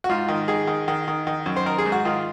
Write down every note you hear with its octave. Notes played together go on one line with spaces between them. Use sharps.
F#4
G#2 F4
D#3
D#3 G#4
D#3
D#3
D#3
D#3
F#2
C5
D#3 A#4
G#4
G#2
F#4
D#3 F4